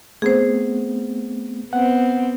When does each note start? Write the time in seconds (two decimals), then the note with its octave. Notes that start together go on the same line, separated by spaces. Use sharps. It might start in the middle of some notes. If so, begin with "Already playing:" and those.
0.22 A3 B3 C4 G#4 C5
1.73 B3 C4 F#5